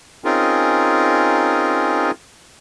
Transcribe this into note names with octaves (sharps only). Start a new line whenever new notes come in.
C4 C#4 D#4 F4 G#4 A#4